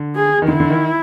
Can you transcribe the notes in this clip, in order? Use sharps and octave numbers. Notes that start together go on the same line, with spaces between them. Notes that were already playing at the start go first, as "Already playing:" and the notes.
Already playing: D3
G#4
D#3
D3 E4
D3
D#3